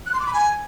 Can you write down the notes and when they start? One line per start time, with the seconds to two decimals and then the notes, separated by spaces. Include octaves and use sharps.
0.06 F#6
0.13 C6
0.20 D6
0.27 B5
0.34 G#5